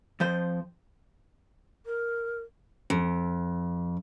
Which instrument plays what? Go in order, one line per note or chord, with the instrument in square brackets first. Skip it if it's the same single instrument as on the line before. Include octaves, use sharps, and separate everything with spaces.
[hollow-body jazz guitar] F2 F3 C5
[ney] A#4
[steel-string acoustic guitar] F2